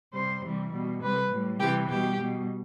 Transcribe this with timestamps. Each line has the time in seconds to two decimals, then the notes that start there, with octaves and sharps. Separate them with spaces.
0.12 C3 G3 C5
0.42 C3 E3 G3
0.71 B2 G3
1.01 C3 G3 B4
1.31 A2 G3
1.59 C3 E3 G3 G4
1.89 B2 G3 G4
2.19 B2 G3